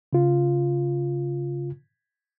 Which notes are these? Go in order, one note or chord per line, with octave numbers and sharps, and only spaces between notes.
C#3 F4